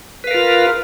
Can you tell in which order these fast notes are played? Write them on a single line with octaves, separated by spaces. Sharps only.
B4 F5 A#4 F4